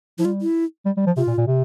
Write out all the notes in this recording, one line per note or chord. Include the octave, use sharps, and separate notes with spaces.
F3 E4
G3 F4
E4
G3
G3
F3
C3 F4
A#2
A#2
C3